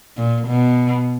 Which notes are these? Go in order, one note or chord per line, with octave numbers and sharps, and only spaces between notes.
A#2
B2